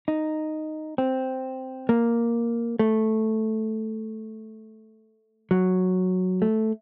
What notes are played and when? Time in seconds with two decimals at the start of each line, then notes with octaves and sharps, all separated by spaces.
0.08 D#4
0.98 C4
1.89 A#3
2.79 A3
5.51 F#3
6.42 A3